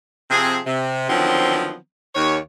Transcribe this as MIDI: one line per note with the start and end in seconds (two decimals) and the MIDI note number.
0.31 0.58 48
0.31 0.58 53
0.31 0.58 60
0.31 0.58 68
0.66 1.08 48
1.10 1.75 50
1.10 1.75 51
1.10 1.75 53
1.10 1.75 54
1.10 1.75 59
1.10 1.75 60
2.15 2.36 39
2.15 2.36 73